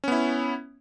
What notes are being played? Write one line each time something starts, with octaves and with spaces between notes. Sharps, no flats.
B3 C#4 E4